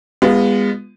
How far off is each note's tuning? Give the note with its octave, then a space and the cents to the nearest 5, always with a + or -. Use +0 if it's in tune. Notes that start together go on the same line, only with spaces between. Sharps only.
G#3 -30 B3 +0 F4 +0